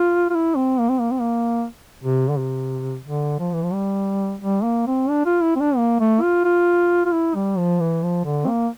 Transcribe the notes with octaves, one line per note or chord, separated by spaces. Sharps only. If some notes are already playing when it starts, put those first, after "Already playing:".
Already playing: F4
F4
E4
C4
A#3
C4
A#3
C4
A#3
C3
D3
C3
D3
F3
E3
F3
G3
G3
A#3
C4
D4
F4
E4
C4
D4
A#3
A3
F4
F4
F4
E4
G3
F3
E3
F3
D3
C4
A#3